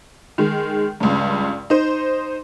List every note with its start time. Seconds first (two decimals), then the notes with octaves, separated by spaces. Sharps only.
0.38 D#3 G#3
1.00 C#2 G2
1.70 D#4 C5